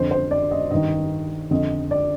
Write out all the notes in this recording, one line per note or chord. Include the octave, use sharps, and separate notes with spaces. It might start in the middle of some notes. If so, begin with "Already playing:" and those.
Already playing: F2 D3 C5
C5
D5
D#5
G2 D#3 D#5
F2 D3 D#5
D5